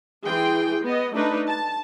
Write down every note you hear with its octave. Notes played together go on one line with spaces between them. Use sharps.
E3 G#4 G5 C6
B3 D#5
A3 D4 D#4 B4
A5